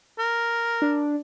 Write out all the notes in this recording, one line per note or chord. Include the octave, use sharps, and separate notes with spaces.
A#4
D4